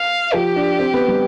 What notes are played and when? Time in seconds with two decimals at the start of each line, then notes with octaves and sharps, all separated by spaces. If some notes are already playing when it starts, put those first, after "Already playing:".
Already playing: F5
0.33 F3 G4
0.56 D4
0.79 C4
0.94 B3
1.08 G3